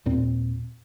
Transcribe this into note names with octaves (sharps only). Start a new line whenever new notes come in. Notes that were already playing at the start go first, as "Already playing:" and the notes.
D#2 A#2 C4